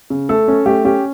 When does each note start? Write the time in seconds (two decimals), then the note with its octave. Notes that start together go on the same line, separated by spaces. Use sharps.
0.10 C#3
0.29 A3 A4
0.48 C#4
0.66 A3 G4
0.85 C#4 G4